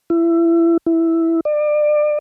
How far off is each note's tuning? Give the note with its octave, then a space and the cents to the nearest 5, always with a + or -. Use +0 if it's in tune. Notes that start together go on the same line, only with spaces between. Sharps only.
E4 +25
E4 +0
D5 +30